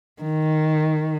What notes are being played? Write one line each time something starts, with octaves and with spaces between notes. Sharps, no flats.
D#3